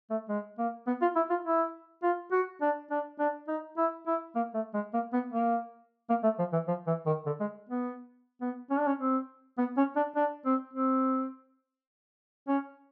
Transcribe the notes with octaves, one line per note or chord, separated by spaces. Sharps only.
A3
G#3
A#3
B3
F4
E4
F4
E4
F4
F#4
D4
D4
D4
D#4
E4
E4
A#3
A3
G#3
A#3
B3
A#3
A#3
A3
F3
E3
F3
E3
D#3
D3
G#3
B3
B3
C#4
D4
C#4
C4
B3
C#4
D4
D4
C4
C4
C#4